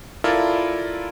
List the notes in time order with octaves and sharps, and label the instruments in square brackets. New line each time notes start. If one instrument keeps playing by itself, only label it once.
[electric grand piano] E4 F4 A4 A#4 D5